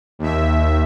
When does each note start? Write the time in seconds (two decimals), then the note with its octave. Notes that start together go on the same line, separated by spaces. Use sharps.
0.19 D#2 E5